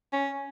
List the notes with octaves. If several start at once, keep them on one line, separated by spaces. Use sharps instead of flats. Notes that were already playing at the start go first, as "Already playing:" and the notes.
C#4